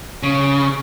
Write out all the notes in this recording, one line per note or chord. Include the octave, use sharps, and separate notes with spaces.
C#3